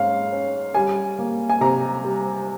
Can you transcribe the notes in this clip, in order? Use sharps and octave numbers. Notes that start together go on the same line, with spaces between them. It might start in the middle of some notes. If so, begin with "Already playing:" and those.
Already playing: G#2 C#4 F5
C#4
G3 G#5
A#3
G#5
C3 A#5
G3